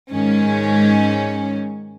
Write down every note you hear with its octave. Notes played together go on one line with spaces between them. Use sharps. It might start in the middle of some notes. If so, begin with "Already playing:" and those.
G#2 D#3 C#4